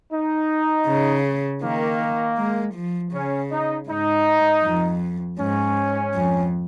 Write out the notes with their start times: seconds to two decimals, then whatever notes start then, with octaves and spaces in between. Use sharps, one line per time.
0.12 D#4
0.87 C#3
1.62 D#3 A#3
2.37 G#3
2.75 F3
3.13 C#3 C#4
3.51 D#4
3.88 G#2 D#4
4.63 F2
5.39 G#2 C#4
6.14 F2